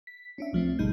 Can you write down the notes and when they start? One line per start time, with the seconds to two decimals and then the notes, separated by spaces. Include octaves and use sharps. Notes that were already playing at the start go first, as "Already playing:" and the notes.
0.07 B6
0.38 C#4 D4 E5
0.53 C2 F3 A3 C4
0.79 G#1 B2 G3 D#4 G6